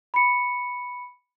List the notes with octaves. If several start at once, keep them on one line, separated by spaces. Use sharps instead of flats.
B5 C#7